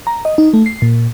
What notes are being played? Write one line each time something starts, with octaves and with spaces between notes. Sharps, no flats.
A#5
D#5
D#4
A3
C7
A#2